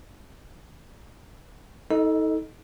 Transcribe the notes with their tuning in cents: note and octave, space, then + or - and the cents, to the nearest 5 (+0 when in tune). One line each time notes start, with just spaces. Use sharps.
D#4 +35 A4 +0 D#5 +0